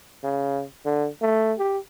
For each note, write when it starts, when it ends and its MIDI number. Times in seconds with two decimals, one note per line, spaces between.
0.24 0.63 49
0.85 1.08 50
1.22 1.53 57
1.59 1.78 67